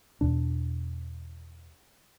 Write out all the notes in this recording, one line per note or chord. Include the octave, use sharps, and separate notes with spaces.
E2 B2 D4